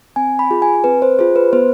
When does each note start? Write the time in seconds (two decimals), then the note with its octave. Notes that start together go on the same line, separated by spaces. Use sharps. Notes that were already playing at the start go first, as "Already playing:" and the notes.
0.16 C4 G#5
0.39 B5
0.51 F4 G#4
0.62 G#5
0.84 C4 B4
1.02 C5
1.19 F4 G#4 C5
1.36 B4
1.53 B3 C5